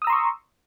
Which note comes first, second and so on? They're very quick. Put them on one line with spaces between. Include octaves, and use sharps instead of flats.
D#6 E6 A#5 C6 C#6